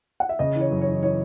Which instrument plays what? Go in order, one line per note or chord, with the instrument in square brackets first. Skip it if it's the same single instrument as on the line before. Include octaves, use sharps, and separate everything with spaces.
[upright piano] F#5
E5
[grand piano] C#3 [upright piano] D#5
[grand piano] E3 [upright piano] C#5
[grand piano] F#2
[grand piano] E3 [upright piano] C#5
[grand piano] E3 [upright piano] C#5